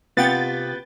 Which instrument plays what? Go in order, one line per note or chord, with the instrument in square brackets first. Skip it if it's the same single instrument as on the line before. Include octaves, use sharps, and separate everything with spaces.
[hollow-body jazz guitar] C3 B3 F4 [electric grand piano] B4 F#5 G5 [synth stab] A6